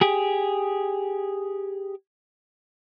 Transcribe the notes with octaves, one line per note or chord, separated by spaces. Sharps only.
G4 G#4